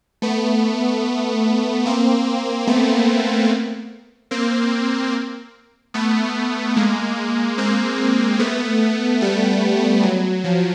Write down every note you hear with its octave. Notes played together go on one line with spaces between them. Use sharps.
A3 B3
A#3 C4
A3 B3
A#3 C4
A3 B3
G#3 A#3
A#3 C4
A3 B3
G3 A3
F#3
F3